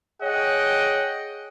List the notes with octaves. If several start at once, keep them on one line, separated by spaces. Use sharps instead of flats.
G#4 C#5 D#5 F#5 G5